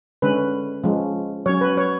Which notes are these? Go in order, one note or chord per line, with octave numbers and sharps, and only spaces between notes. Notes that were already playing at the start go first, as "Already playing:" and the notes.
D3 G#3 C#4 B4
F3 G#3 C#4
F#3 C#4 C#5
B4
C#5